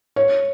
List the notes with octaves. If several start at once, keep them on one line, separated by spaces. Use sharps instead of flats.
C#5